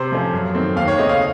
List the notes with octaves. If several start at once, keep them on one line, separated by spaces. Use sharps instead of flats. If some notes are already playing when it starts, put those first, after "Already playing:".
Already playing: C3 C5
F3 A3 C#4
F#2
D#3 A3 C4
D#2 F5
C#5
C#3 A3 C4 D#5
F5